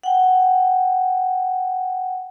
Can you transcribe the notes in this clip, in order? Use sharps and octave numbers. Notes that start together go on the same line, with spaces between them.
F#5 G5